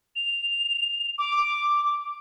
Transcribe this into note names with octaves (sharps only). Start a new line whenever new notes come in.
F7
D6